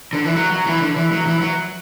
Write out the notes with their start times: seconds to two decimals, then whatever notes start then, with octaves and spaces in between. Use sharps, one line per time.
0.13 D3
0.25 E3
0.36 F#3
0.52 F#3
0.67 E3
0.81 D3
0.96 E3
1.12 F#3
1.27 E3
1.42 F#3